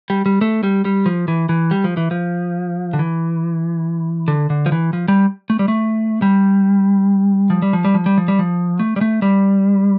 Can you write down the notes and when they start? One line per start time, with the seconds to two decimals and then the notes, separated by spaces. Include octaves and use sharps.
0.10 G3
0.26 G3
0.41 A3
0.63 G3
0.85 G3
1.06 F3
1.28 E3
1.49 E3
1.71 G3
1.84 F3
1.97 E3
2.11 F3
2.93 D3
2.99 E3
4.28 D3
4.50 D3
4.66 F3
4.72 E3
4.93 F3
5.08 G3
5.50 A3
5.59 G3
5.68 A3
6.22 G3
7.50 F3
7.62 G3
7.73 F3
7.85 G3
7.94 F3
8.06 G3
8.18 F3
8.28 G3
8.39 F3
8.79 A3
8.96 G3
9.01 A3
9.22 G3